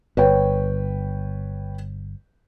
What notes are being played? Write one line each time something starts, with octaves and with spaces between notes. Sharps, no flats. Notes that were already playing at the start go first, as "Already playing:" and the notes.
G1 B4 C#5 G5